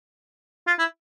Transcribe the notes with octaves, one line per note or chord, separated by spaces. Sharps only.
F4
E4